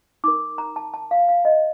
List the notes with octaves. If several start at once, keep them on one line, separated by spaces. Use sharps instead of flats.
D#4 A#4 D6
A#5
A5
A5
F5
F5
D#5